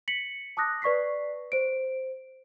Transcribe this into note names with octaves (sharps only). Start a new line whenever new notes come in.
B6 C#7 F#7
A5 D6 D#6 F#6 A#6
B4 D5 C#6 B6 C7
C5 D7